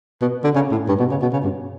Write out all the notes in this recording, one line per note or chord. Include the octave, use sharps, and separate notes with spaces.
B2
D3
C#3
A2
G2
B2
C#3
B2
C#3
G2